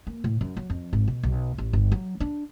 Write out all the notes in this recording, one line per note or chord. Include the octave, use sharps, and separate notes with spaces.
A#3
A2
F#2
F#3
F2
G#1
B2
B1
A1
G1
F#3
D4